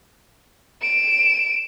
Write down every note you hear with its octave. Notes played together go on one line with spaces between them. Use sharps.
D7 E7